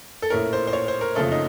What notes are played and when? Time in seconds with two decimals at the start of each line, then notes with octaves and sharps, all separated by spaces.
0.22 A4
0.30 A#1 A2 A3 C#4 A#4
0.53 C5
0.67 C5
0.73 C#5
0.88 C5
1.01 A#4
1.15 F#1 F2 C#3 A3 A4
1.32 D#4